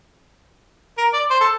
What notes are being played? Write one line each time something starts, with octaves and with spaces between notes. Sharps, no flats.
A#4
D5
C5
A4